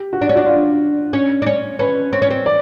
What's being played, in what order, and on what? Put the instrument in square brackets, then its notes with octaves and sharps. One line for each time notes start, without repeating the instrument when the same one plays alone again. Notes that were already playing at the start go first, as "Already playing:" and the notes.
Already playing: [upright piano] G4
F#4
[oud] D4
C#4
[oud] D4 [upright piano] F#4
[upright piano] F4
[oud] C#4
D4
C#4
[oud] C#4 [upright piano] B4
[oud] C4 [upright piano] C#5
[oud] C#4
C4
[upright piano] D5